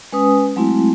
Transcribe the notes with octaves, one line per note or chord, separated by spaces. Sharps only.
G#3 C#4 B4 G#5 D#6
F#3 G#3 A3 C4 E4 F#4